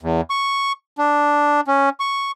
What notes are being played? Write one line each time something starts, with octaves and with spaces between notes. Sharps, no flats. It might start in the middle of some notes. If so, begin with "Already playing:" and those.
E2
C#6
D4
C#4
C#6